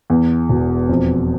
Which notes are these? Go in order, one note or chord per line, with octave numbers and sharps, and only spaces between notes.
E2
E1
F2